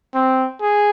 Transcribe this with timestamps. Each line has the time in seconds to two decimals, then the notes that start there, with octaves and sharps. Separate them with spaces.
0.14 C4
0.61 G#4